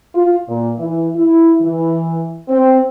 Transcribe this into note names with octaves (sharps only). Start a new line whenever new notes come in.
F4
A#2
E3
E4
E3
C4